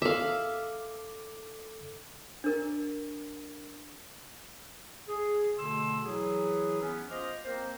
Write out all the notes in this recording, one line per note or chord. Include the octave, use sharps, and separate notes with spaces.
A4 E5 F5 D6
D4 A#4
G#4
B2 D3 A3 C6 E6
E3 F#3 E4 G#4
B3 C#4
F4 C5 D#5 D6 F6
A#3 C4 A#4 C5